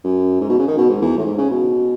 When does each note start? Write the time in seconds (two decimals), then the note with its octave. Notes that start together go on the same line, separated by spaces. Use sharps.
0.04 F#2
0.40 G#2
0.49 B2
0.59 C#3
0.68 D#3
0.77 B2
0.89 G#2
1.01 E2
1.17 A2
1.26 G#2
1.38 C#3
1.50 B2